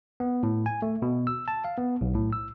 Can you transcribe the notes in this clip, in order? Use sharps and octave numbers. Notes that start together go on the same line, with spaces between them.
B3
A2
G#5
A3
B2
E6
A5
F5
B3
B1
A2
E6